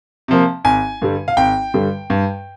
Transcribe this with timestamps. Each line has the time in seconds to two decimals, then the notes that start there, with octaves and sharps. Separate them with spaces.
0.28 C3 F3 A#3
0.65 G#1 G#5
1.02 G2 D3 G3
1.28 F5
1.37 G#1 G5
1.74 G2 D3 G3
2.10 G2